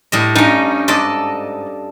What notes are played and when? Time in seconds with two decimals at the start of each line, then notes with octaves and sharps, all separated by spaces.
0.12 A2 G3 D#5
0.35 G2 C#4 D#4
0.88 G#2 A4 D5 D#5